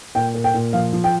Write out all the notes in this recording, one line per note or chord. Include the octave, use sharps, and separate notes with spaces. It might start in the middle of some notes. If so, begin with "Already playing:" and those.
A#2 G5
A#2
G5
A#2
F3 F5
F3
G5